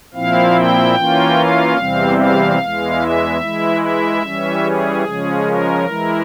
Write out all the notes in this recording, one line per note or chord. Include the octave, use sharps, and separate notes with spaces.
A#2 F3 C4 E4 F5
G5
E3 A#3 C#4 F4
F5
E2 C3 E3 G3 C4
F5
E2 E3 G#3
E5
E3 G#3 E4
E5
E3 G3 C#4
G#4
C#3 F3 G#3 C#4
A#4
E3 G#3 E4